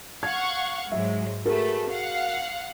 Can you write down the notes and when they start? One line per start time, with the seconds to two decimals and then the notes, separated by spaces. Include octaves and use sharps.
0.23 F5 F#5 C#6 G#6
0.92 G#2 F#3 G#3 E5
1.45 A3 F#4 G#4 A#4 B4
1.90 F5 F#5